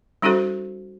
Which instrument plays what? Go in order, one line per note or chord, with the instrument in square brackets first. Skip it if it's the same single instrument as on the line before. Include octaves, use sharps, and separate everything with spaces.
[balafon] G3 C#4 D#4 F#4 A4 C5